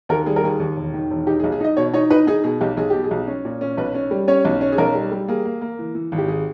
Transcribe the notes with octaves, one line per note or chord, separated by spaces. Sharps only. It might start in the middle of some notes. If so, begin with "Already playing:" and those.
D#2 A#4
G3 G#4
A#4
D#2 G#4
D#2
E1
D#3
E1
D#4 G4
G#4
B1
G#4
D#4 D#5
B2 C#5
D#4 C#5
D#4 B4
D#4 G#4
B2 G#4
B1 G4
B1 G#4
B2 G4
G#4
B1
C#4
A#2
C#4
B1 B4
C#4
G3
C#4 C#5
B1
C#4
G#4
B1 A#4
G3
G3
A#3 G#4
A#3
A#3
E3
E3
G#1
G4
G#4